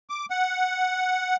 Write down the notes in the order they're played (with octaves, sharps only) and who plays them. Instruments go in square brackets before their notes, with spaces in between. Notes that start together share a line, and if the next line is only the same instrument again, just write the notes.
[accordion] D6
F#5